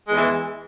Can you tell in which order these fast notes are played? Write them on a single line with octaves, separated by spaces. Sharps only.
G#3 E2 E3